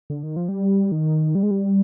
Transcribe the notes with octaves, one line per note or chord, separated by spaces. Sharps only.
D3
D#3
F3
G3
D#3
G3
G#3
G3